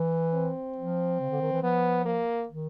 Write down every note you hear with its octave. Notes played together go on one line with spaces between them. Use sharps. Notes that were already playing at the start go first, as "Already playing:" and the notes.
Already playing: E3
C4
F3
C#3
D3
D#3
E3
F3 B3
A#3
D#3